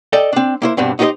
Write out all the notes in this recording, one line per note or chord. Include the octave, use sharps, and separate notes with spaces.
A4 D5 D#5 G5
C4 D4
A#3 E4 C5
G2 B2 C4 D4
D#4 F#4 G4 A#4 C5 D#5